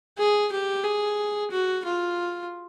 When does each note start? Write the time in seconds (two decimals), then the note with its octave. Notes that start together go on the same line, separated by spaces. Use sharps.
0.18 G#4
0.52 G4
0.84 G#4
1.51 F#4
1.85 F4